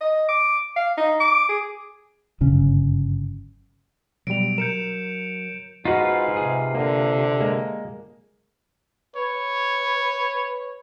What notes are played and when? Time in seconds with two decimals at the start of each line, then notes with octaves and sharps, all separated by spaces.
0.01 D#5
0.29 D6
0.76 F5
0.98 D#4
1.20 D6
1.49 G#4
2.41 G1 F#2 C#3
4.27 B2 F#3 G3 D7 F7
4.58 A#4 G6 C#7 E7
5.85 G#2 D#4 F4 F#4 B4 F5
6.37 C3 G#4
6.75 D3 A#3
7.40 G#3 A#3
9.16 B4 C#5